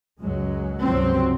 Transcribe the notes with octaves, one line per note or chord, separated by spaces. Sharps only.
C#2 F#2 F#3 G#3
C#2 G2 C3 F3 F#3 C4